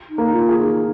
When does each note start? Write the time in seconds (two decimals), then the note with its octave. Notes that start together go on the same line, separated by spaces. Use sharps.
0.10 D#4
0.18 A#3
0.33 F4
0.49 G#4
0.58 D#4